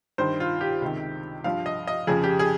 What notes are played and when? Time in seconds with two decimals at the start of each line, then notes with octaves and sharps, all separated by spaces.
0.18 G2 D#3 C5
0.40 F4
0.61 G4
0.82 C#2 C3 D#3
1.44 G2 F3 F5
1.66 D#5
1.87 D#5
2.07 F2 C#3 F3 G#4
2.24 G4
2.39 G#4